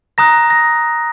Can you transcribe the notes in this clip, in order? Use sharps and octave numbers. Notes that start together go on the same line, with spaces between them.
A#5 D#6 F#6 A#6
A#6